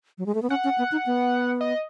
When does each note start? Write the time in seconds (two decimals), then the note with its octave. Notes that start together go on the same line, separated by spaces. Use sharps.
0.18 F#3
0.26 G#3
0.35 A3
0.42 B3
0.50 C#4 F#5
0.64 C#4
0.78 B3
0.92 D#4
1.06 B3
1.61 D#5